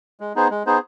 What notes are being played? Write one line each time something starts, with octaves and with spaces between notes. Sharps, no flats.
G#3
B3 D#4 G#4 C5
G#3
B3 D#4 G#4 C5